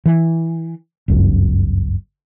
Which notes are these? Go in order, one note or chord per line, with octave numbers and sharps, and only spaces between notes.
E3
G1 C#2 F#2